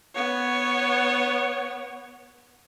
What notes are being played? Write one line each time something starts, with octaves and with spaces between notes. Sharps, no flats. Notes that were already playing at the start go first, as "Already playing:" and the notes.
B3 C#5